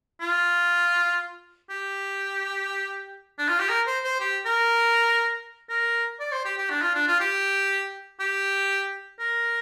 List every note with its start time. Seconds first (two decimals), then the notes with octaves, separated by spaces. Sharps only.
0.21 F4
1.70 G4
3.39 D4
3.49 F4
3.59 G4
3.70 A#4
3.87 C5
4.04 C5
4.20 G4
4.46 A#4
5.69 A#4
6.20 D5
6.32 C5
6.45 G4
6.58 G4
6.70 D4
6.82 F4
6.94 D4
7.08 F4
7.20 G4
8.20 G4
9.19 A#4